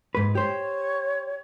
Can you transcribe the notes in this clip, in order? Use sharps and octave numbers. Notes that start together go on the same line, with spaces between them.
G#2 B4
G4 C5 C#5